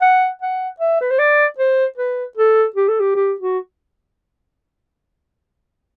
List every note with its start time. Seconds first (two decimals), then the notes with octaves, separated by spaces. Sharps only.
0.02 F#5
0.42 F#5
0.80 E5
1.01 B4
1.11 C5
1.19 D5
1.58 C5
1.97 B4
2.37 A4
2.76 G4
2.88 A4
3.00 G4
3.15 G4
3.40 F#4